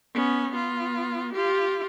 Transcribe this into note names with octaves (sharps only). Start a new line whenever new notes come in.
B3 C#4
B3 F4
F4 G4